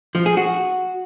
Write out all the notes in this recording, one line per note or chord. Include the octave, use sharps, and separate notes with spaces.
F3
G#4
F#4